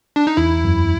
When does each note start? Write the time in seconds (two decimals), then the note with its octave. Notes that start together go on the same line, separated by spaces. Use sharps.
0.16 D4
0.27 D#4
0.37 E2 E4
0.65 F#2